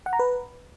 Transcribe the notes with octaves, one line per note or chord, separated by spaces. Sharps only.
F#5
A#5
B4